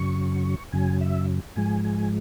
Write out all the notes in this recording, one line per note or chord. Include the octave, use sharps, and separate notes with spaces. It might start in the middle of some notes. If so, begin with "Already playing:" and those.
Already playing: F#2 C#3 F#3 C#6
F#2 C#3 F#3 G#5
E5
G#2 F3 G#3 G#5
G#5